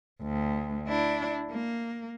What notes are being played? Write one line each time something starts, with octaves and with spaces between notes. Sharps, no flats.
D2
D4 E4
A#3